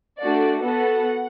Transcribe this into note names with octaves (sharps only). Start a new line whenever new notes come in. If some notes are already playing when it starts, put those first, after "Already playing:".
A3 D4 F#4 D5
B3 F#4 A4 F#5